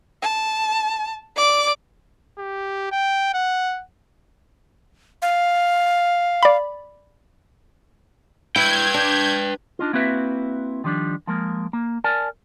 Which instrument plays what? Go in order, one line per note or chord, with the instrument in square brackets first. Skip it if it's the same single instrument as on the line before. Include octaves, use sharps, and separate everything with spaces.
[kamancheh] A5
D5 D6
[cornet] G4
G5
F#5
[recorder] F5
[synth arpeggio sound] D5 B5
[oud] E4 [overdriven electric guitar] B4 G5 [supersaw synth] G6 G#6
[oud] D4
[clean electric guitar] D4 D#4 F4
A#3 C4 E4 F#4 B4 E5
D#3 F3 G3 D4
F3 G#3 A#3 A#4
A#3
A#4 D5 G#5 A5